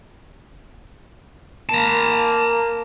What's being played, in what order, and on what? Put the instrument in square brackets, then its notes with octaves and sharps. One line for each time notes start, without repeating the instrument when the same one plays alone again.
[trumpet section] A#3 [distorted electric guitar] A5 A#5